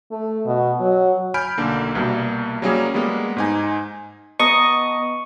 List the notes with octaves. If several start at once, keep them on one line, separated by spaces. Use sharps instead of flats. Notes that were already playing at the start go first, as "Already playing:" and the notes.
A3
B2
F#3
G#5 B5 F6 G6 D7
B1 D3 A#3
C2 B2 G3 A#3
F#3 G3 A#3 C#4 G#4 C#5
G3 G#3 A#3 B3
G#2 D#4 G#5
B3 D#5 A5 A#5 C#6